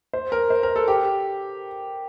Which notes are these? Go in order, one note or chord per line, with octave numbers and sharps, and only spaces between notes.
C5
A#4
C5
A#4
A4
G4